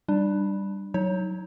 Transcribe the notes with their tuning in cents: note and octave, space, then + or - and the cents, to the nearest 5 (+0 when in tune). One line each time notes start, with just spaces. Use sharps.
G3 +0 D4 +25
F#3 +0 D#4 +30 C#5 +0